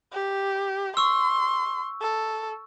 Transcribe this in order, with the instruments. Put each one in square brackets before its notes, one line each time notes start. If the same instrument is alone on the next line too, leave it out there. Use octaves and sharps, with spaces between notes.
[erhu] G4
[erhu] C6 [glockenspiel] C#6 E6
[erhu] A4